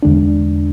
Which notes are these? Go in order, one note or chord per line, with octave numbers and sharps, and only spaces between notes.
E2 D3 G#3 D4